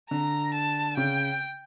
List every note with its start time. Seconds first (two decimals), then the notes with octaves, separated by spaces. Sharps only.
0.11 D3 A#5
0.54 A5
0.97 C#3 G5